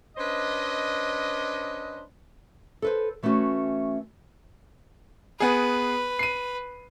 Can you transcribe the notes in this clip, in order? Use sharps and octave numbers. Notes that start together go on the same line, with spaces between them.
C#4 D4 B4 C5 D#5
A4 B4 C5
E3 A3 B3 C#4 F#4
B3 G#4 B4
C7 D#7